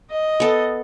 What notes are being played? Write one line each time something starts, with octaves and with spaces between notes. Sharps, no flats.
D#5
B3 A4